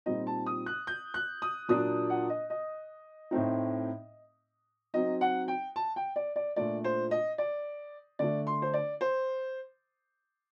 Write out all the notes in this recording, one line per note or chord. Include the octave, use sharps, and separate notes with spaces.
A#2 G3 C4 D#4 D#5
A5
D#6
F#6
G6
F#6
D#6
A#2 F#3 A#3 D4 D#6
F#5
D#5
D#5
A2 A3 C4 D#4
F#3 C4 D#4 D#5
F#5
G5
A5
G5
D5
D5
A#2 A3 D4 D5
C5
D#5
D5
D3 A3 D4 D5
C6
C5
D5
C5